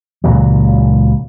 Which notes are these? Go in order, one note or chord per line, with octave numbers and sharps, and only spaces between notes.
C#2 A#2 E3 F#3